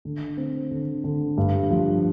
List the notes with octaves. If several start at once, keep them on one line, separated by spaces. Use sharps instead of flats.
D3
C4
D3
D3
G2
F3